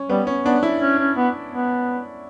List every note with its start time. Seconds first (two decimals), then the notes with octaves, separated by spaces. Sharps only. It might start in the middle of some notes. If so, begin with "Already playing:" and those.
Already playing: C#4
0.09 G3 B3
0.27 C#4
0.45 B3 D4
0.63 E4
0.81 C#4
0.99 C#4
1.16 B3
1.51 B3